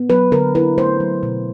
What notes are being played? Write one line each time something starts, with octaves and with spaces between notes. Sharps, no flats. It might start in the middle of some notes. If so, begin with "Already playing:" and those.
Already playing: B3
F#3 B4
D3 A#4
E4 B4
A3 C5
F#3
B2